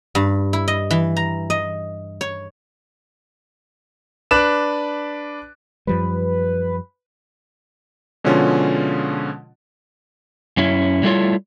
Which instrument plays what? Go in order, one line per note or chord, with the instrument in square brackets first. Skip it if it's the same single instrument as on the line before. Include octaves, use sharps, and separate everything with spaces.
[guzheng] G2
E4
D#5
E3
A#5
D#5
C#5
[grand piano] D4 B4 D6 F#6 E7
[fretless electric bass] F#2 F3 G3 [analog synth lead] B4
[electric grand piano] B2 D3 F3 G#3 C#4 F4
[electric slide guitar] F#2 C#4 E4
F#3 G3 A3 E4 F4 C#5